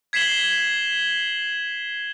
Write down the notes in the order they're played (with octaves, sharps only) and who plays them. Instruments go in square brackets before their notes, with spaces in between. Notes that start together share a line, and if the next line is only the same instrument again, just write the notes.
[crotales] G#6 B6 C7 E7 F#7 G7